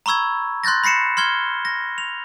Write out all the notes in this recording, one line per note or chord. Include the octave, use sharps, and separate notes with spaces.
A#5 B5 C#6 E6 G#6
C6 F#6 G6 A6 A#6
B5 A#6 C7 C#7 E7
C6 F6 G#6 G7
A#6
F7